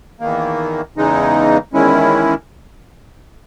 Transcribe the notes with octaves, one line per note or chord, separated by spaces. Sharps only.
E2 D#3 A#3
E2 C#3 E3 G#3 D#4
E2 D#3 G#3 C#4 E4